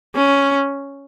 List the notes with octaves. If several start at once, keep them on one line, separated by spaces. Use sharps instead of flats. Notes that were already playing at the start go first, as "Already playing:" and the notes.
C#4